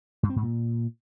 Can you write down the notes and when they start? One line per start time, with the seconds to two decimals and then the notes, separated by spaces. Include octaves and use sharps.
0.23 G2
0.30 C4
0.36 G#2
0.43 A#2